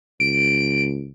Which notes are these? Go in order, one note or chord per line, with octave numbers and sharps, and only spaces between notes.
C#2 D7